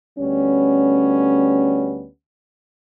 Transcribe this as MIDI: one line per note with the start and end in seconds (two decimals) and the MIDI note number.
0.19 2.07 38
0.19 2.07 55
0.19 2.07 59
0.19 2.07 61